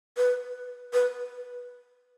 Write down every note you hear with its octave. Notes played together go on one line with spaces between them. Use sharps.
B4
B4